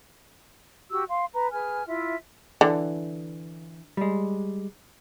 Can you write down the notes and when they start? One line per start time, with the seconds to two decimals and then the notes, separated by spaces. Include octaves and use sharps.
0.91 F#4 G4 E6
1.08 F5 C6
1.34 B4 A#5
1.51 G#4 B4 G#5 F6
1.87 E4 F4 E5
2.61 D3 E3
3.97 G3 G#3